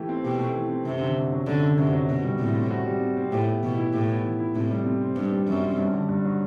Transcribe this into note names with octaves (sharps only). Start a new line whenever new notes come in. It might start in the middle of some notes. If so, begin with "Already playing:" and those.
Already playing: E3 A3 G4
C4
B2 G4
A3
E3
C4
F#2 C3
D3
F#2
F#3
F#2 D3
D3
F#2 C3
F#3
B2 F#4
G3
A2 C3
C4
F#4
G3
C3
C4
A2 G4
B3
B2 E3
E4
A2 G4
B3
E3
E4
A2 C3
G3
C3
C4
G2 C3
G3
F#2 C3
C4
G2
D3
G2
F#3